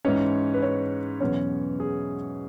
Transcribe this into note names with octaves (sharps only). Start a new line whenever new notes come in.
G#2 E3 G#3 C#4 C#5
B4
C#4 C#5
E2 B2 F#3 B3 C#4 C#5
G#4